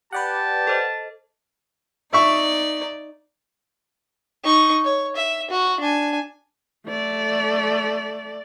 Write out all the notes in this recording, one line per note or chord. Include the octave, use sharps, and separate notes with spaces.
G4 B4 D5 F#5 A5
A4 C5 D#5
D#4 D5 E5 C#6
D#4 C#6
C#5
E5
F#4
D4 G#5
A3 D5